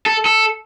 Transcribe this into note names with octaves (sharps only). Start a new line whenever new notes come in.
A4
A4